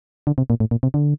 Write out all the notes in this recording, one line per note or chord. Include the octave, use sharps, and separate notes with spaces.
D3
C3
A#2
A2
A#2
C3
D3